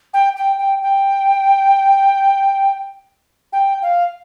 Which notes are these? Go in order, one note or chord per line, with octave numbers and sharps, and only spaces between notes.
G5
G5
G5
G5
G5
F5